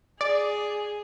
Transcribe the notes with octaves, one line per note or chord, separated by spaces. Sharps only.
G#4 D5